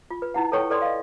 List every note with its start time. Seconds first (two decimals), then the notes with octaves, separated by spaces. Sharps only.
0.10 F4
0.22 B4
0.34 D#4 E4 F#5
0.52 A4 B4 C#5 G5 C#6
0.70 A4 B4 D5 C6
0.82 D#5 F5